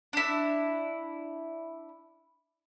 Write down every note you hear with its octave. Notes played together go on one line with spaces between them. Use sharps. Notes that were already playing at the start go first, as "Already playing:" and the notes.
D4 E4